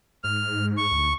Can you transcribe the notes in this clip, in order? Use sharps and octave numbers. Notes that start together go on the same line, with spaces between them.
G#2 F6
C#6
D2